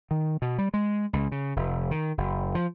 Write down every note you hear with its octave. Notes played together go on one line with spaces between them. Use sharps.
D#3
B2
G3
G#3
C#2
C#3
F1
D#3
F#1
F3